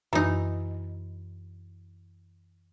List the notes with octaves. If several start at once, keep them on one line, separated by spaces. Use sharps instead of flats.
F#2 E3 D#4